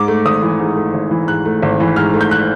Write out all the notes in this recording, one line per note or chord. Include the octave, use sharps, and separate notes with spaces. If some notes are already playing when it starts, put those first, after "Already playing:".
Already playing: G#2 D6
A3
G#1 D#6
E3
G#2
A3
G#1
E3
G#2 F#6
A3
G#1
E3
G#2 F6
A3
G6
F#6